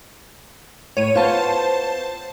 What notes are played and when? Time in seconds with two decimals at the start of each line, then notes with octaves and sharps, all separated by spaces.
0.97 A2 C#5 D#7
1.15 B3 F4 C5 A5